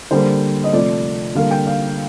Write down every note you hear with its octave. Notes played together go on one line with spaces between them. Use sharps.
D3 G3 A#3 C5
D#5
C3 F3 A3 D5
D3 G3 A#3 F5
G5
F5